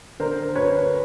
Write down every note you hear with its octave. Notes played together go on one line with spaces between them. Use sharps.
D3 A#4 C5
D2 B4 C#5